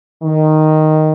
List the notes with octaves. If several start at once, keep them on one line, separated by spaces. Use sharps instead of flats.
D#3